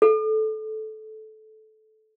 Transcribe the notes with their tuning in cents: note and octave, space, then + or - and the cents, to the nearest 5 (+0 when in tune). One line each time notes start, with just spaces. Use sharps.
A4 -15